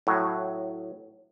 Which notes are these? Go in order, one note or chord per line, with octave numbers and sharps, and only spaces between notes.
A2 F#3